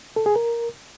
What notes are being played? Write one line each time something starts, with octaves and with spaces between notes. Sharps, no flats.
A4
G#4
A#4